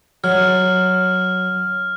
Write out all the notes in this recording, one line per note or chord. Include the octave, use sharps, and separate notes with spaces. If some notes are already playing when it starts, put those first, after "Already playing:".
F#3 F6